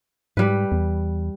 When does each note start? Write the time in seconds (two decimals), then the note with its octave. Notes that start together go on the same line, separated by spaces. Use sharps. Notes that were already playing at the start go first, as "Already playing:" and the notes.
0.37 G#2 G3 B4
0.72 E2